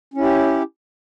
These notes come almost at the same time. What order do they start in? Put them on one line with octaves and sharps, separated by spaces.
C#4 E4 G4